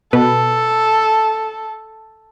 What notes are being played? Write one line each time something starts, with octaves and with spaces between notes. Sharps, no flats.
B2 A4 B4